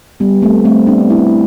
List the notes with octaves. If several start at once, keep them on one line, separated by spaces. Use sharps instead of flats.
G3 B3
A3 C4
A3 C4
B3 D4
C4 E4